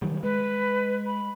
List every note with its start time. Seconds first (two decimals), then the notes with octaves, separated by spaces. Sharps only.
0.02 D#3 F#3 G3
0.23 G#3 B4
1.06 B5